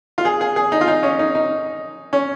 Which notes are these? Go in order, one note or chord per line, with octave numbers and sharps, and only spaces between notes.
F4
G#4
G#4
G#4
D#4
F4
D#4
C#4
D#4
D#4
C#4